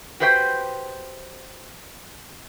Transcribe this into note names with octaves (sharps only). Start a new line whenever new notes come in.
F#4 G4 B4 C5 D5 G5